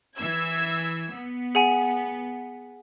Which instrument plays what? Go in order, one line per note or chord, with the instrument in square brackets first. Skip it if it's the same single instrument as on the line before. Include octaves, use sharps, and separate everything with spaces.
[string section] E3 E6 G#6
B3
[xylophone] G#4 F#5 G#5